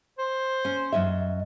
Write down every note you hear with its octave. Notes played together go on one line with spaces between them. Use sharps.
C5
C#4
F#2 D#5 E5